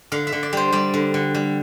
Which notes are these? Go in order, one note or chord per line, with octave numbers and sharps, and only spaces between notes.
D3 F5
E5
D3
D5
G3 C5
G3 D5
D3
D3
G3